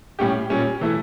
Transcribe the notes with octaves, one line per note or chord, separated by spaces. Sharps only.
A2 G3 C#4 G4
A#2 G3 C#4
E3 A3 E4